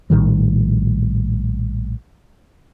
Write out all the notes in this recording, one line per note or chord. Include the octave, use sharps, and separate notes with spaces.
A#1 A2 D#3 G3